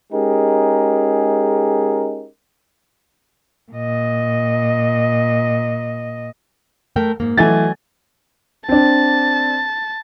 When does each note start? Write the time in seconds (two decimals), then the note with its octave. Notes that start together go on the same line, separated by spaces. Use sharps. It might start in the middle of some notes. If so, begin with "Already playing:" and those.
0.13 G#3 C#4 D#4 G4 G#4 A#4
3.72 A#2 D#5
6.96 A3 A#4 G5
7.20 G#2 A#3
7.37 E3 F#3 A3 D#5 G#5 A6
8.69 C4 D4 A5